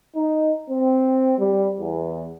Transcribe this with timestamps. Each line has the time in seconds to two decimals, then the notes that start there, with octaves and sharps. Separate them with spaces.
0.15 D#4
0.69 C4
1.39 G3
1.80 E2